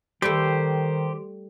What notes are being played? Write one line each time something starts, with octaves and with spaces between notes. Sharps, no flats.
D#3 G3 A3 G4 C5